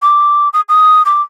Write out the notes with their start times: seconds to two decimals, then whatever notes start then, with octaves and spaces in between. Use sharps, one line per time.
0.02 D6
0.53 D#6
0.69 D#6
1.05 D6